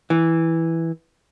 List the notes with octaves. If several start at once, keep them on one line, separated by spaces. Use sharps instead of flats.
E3